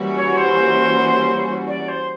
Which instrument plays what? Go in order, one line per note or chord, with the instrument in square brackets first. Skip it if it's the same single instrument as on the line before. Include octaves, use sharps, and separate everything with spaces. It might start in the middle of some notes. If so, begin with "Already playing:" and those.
Already playing: [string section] E3 G3 A#3 C#4 F#4
[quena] C#5
C5
D5
C5